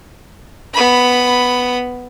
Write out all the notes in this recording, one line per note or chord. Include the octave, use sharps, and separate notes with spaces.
B3 B5